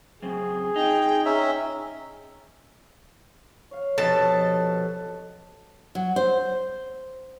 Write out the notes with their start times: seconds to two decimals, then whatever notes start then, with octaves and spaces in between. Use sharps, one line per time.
0.23 F#2 C#3 C4 G#4
0.76 D#4 F4 G5
1.25 C#4 E5 A#5
3.71 C#5 F5
3.98 F1 B2 A4 A5
5.95 F#3
6.16 C5